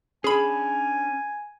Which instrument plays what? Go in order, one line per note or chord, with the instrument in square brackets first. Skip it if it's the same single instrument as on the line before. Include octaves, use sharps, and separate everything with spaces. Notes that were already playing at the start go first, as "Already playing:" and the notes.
[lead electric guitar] C#4 D4 [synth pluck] G#4 B5 [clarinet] G#5